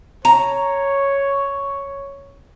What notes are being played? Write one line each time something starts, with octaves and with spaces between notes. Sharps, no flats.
C#5 A#5